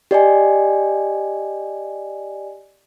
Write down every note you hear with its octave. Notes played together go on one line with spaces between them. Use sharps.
G4 D5 D#5 G#5